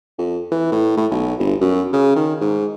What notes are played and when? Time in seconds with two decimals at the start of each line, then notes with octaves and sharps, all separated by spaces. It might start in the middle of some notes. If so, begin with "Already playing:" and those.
0.18 F2
0.52 E3
0.72 A2
0.97 A2
1.11 B1
1.40 G1
1.61 F#2
1.93 C#3
2.16 D#3
2.41 G#2